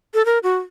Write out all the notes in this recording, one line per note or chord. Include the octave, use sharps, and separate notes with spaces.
A4
A#4
F#4